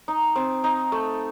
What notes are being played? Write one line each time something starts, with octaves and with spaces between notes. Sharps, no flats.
D#4
C4
D#4
A3